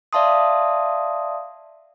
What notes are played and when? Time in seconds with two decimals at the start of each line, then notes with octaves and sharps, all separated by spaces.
0.13 D5 E5 F5 A5 C6 D#6